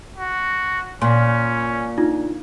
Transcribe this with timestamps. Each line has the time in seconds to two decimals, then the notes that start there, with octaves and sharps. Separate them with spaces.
0.16 F#4
1.02 A#2 C#4 C6
1.98 D4 D#4 F4